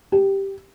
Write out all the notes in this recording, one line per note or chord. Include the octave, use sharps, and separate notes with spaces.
G4